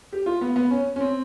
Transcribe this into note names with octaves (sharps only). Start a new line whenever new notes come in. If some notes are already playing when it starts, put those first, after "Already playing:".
G4
F4
B3
B3
C#4
C#4
C4